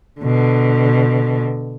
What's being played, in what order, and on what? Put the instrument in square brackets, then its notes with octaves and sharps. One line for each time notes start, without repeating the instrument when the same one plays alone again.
[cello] B2 D3